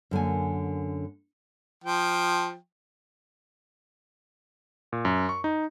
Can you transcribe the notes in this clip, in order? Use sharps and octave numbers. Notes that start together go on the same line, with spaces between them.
F#2 D3 A#3 G#5
F3 G5
A#2
F#2
C#6
D#4